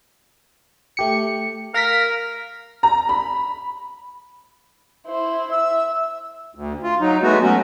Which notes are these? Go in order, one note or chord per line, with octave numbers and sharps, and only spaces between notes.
A3 G4 C#7
A#4 F5 A#6 B6
A#5
B5
E4 C5
E5 E6
D2
F4
F#3 D#4
G#3 A3 B3 F#4
F#3 A3 C#4 F#4